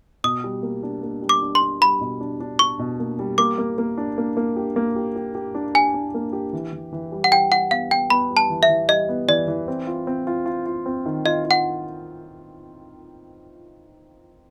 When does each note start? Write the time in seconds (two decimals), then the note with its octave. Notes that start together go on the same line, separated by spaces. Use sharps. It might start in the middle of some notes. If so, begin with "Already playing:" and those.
0.24 B2 D#6
0.44 G3
0.63 A#3
0.83 D4
1.03 A#3
1.22 G3
1.29 D6
1.42 D4
1.55 C6
1.61 D4
1.81 G3 B5
2.01 B2
2.20 D4
2.40 D4
2.59 D4 C#6
2.79 B2
3.00 A#3
3.19 G3
3.38 A#3 D6
3.58 A#3
3.78 A#3
3.97 D4
4.18 A#3
4.37 A#3
4.56 G4
4.76 A#3
4.96 G4
5.16 G4
5.35 G4
5.55 D4
5.74 G4 G#5
5.94 D4
6.14 A#3
6.33 G4
6.53 E3
6.73 E3
6.92 E3
7.12 G3
7.24 F#5
7.32 G3 G5
7.51 G3 F#5
7.71 B3 F5
7.91 B3 G5
8.10 B3 B5
8.30 G3
8.37 A5
8.50 E3
8.63 E5
8.69 E3
8.89 G3 D#5
9.09 B3
9.28 E3 D5
9.48 E3
9.68 C4
9.87 F4
10.07 C4
10.27 F4
10.46 F4
10.66 F4
10.86 C4
11.06 D#3
11.25 F4 D#5
11.44 F4
11.51 F#5